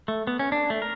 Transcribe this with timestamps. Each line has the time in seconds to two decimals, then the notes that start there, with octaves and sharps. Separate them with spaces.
0.08 A3
0.27 B3
0.39 C#4
0.52 D4
0.70 A3
0.82 A#4